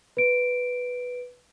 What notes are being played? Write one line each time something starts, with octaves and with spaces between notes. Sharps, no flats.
B4 D7